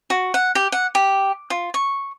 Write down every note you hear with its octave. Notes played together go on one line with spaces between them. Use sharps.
F#4
F#5
G4
F#5
G4
F4
C#6